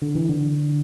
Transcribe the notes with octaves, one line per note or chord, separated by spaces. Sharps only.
D3
E3
D3